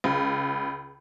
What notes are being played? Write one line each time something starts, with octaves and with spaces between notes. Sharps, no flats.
C#2